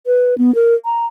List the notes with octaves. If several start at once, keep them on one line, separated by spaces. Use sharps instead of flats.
B4
B3
A#4
A#5